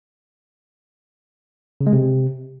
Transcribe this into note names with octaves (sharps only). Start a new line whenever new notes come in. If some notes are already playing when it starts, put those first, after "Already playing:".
C#3
G#3
C3